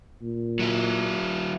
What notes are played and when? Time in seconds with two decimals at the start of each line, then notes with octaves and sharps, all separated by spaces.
0.22 A#2
0.59 F#3 E4